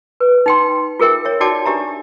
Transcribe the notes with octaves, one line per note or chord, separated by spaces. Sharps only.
B4
D#4 G5 C6
F4 G#4 A#4 E5 G5
C#5 E5
D#4 F#4 D5 G5 A5 D6
D4 G4 E5 A#5